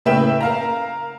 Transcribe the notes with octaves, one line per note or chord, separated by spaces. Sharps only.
A2 C#3 B4 E5 G5 E7
A#4 F5 A#5